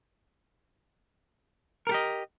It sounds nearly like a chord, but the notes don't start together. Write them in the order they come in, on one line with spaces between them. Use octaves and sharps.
A#4 A4 G4 D#5